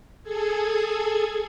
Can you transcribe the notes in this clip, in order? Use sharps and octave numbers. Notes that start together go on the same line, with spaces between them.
G#4 A4 G#6